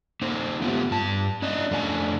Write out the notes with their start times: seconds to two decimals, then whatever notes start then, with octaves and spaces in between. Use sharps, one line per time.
0.22 A#3 D#4 C5
0.62 A3 B3 F4 G4
0.91 G2 A5
1.42 C#4 D4 D5 D#5
1.71 F2 A3 D4 F#4 G#5